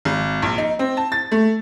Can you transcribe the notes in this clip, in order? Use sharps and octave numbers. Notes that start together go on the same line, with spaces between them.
G#1
A#1
D#4
C4
A5
A6
A3